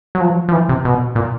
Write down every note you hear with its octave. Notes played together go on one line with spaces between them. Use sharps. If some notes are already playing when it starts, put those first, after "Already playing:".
F#3
F3
F3
E3
C3
B2
A#2